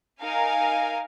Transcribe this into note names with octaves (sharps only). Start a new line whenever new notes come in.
D#4 A#4 F5 G#5